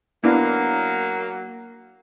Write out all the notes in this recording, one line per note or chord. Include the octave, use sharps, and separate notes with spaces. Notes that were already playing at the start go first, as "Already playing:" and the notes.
F#3 A#3 B3 D4 E4